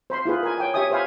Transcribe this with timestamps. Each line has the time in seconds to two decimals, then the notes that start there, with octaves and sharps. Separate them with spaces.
0.10 C5 B5 C6
0.25 E4 F4 G#4 B4
0.43 A#4 G#5
0.58 C#5 G5 G#5
0.74 G4 C#5 E5 G#5 D#6
0.91 B4 C5 E5 F5 G#5 B5